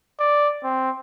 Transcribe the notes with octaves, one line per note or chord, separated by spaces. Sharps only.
D5
C4